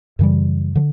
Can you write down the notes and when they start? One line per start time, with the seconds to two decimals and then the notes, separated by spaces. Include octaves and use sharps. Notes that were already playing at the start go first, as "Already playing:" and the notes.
0.19 F#2 C#3 E3 G3
0.76 D3 F3